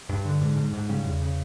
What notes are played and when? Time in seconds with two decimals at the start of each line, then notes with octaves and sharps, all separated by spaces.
0.09 G2
0.25 D3
0.41 G#2
0.57 G#2
0.73 G#2
0.89 C#3 G3
1.05 E2
1.21 C#3